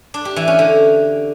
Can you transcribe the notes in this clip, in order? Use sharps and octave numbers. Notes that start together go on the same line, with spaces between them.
D4
G4
E3
C#4
D3